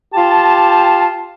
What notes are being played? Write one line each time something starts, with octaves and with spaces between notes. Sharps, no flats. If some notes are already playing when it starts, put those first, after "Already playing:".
F4 G4 A5